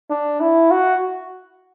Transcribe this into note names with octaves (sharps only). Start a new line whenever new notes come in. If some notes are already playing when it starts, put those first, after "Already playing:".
D4
E4
F#4